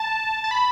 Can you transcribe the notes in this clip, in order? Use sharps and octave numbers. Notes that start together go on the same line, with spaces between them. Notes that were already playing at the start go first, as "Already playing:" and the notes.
Already playing: A5
A5
B5